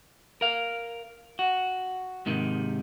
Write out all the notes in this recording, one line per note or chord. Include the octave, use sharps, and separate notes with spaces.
A#4 F5
F#4
G#2 C3 D#3